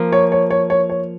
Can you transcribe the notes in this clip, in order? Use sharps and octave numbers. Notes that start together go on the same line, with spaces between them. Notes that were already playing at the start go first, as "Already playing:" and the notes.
Already playing: F3 A#3 A#4
C#5
C#5
C#5
C#5
C#5